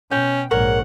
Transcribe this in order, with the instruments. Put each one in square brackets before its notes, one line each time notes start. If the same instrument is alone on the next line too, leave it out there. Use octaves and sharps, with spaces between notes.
[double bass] B2 [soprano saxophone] C#4 [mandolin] G5
[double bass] A#1 G#2 [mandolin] A#4 C#5 [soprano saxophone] F#5